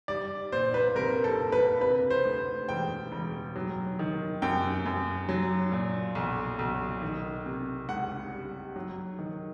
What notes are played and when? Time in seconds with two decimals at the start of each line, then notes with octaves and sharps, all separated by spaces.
0.08 G3 D5
0.52 A#2 C5
0.74 B4
0.96 C2 A#4
1.24 A4
1.39 A#3
1.52 B4
1.81 C3 B4
2.10 C5
2.25 D2
2.69 E1 G5
3.12 E1
3.56 F#3
3.99 D#3
4.42 F#2 G5
4.86 F#2
5.29 F#3
5.72 A#2
6.15 B1
6.59 B1
7.02 D#3
7.46 C3
7.88 C#2 F#5
8.33 G3
8.76 F#3
9.19 D#3